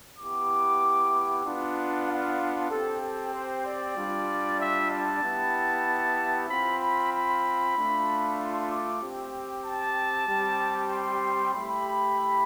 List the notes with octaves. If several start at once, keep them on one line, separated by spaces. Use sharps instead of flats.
B3 E4 G4 D6
B3 D4 F4
F5
C4 G4 A4
A4
C5
D5
G3 D4 F4
E5
A5
B3 E4 G4
C4 F4 B5
B5
B5
A3 D4 F4
C6
D6
C4 G4
A5
G3 C4 G4
C6
A3 E4 G4 B5